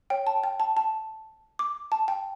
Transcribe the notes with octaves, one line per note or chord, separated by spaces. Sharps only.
C#5 G5
A5
G5
A5
A5
D6
A5
G5